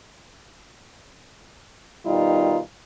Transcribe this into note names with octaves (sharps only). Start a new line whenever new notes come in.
B2 D#3 G3 D#4 F4